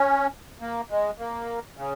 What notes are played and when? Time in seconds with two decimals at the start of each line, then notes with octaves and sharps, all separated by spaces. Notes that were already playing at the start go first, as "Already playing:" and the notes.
Already playing: C#4
0.61 A#3
0.91 G#3
1.19 A#3
1.77 C#3